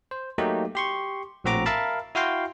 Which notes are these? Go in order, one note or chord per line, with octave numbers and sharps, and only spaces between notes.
C5
F#3 A3 A#3 D#4 G4
G4 C6 C#6
A#1 A2 C4 F#4 A#5 D6
A#4 E5 F5 A5 B5
E4 F#4 F5 G5 C6